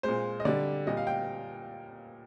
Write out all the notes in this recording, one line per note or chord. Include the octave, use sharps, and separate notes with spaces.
A#2 G#3 C5
D#5
D3 G3 D5
A#2 G3 D#5
F5
G5